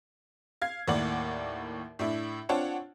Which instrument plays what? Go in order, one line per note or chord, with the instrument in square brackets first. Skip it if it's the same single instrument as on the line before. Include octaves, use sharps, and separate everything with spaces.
[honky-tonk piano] F5 G#6 C7
D#2 A2 A#3 D5 F#5 F#7
A2 D4 E4
C4 D4 F4 C#5 F#5 A5